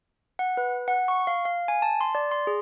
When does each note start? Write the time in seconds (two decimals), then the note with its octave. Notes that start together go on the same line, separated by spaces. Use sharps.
0.39 F#5
0.57 B4
0.88 F#5
1.08 C#6
1.27 F5
1.45 F5
1.68 G#5
1.82 A5
2.01 C6
2.15 D5
2.31 C6
2.47 G#4